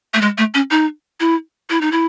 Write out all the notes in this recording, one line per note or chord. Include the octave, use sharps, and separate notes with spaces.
A3
G#3
A3
C#4
D#4
E4
E4
D#4
E4